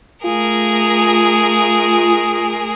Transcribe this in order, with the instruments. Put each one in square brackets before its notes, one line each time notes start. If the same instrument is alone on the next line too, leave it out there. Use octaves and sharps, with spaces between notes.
[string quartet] A3 G#4 A#4 [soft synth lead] F4